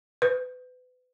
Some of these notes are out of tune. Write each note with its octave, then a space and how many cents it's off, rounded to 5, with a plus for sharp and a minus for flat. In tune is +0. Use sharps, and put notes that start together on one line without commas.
B4 +35